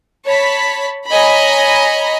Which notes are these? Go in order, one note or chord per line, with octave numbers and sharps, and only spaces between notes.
C#5 A5 B5
C#5 D#5 G#5 A#5 B5